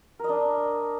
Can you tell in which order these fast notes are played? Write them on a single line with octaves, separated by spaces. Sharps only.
A#4 D#5 D4